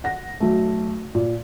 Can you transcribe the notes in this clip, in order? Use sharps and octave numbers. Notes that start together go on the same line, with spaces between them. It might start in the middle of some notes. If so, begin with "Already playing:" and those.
F#5 A#6
B1 A3
A#2